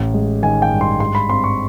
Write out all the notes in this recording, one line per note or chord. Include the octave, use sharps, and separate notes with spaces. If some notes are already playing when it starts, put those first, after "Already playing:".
Already playing: A1
G#3
D#3 G#5
G5
G2
C6
G#2 C6
B5
C4 C6
C#6